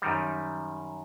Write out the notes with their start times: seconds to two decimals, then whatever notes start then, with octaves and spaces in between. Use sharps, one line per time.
0.02 F#2 D#3 G3